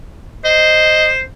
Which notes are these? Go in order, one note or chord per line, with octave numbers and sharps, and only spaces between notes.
C5 D#5